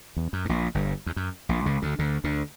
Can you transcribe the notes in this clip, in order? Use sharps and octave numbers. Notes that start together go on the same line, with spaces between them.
E2
F#2
G2
A#1 A#2
G1 G2
E2
F#2
A#1 A#2
C#2 C#3
D2 D3
D2 D3
D2 D3